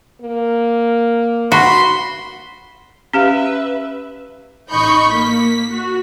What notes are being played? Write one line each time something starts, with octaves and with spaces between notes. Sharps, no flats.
A#3
F#4 B5 C6
C#4 G4 B4 E5 F5
A1 D#4 B5 C#6 G6
A#3 B6
F#4